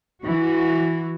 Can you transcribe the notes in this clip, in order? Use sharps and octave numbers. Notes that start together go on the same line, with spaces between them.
E3 F#4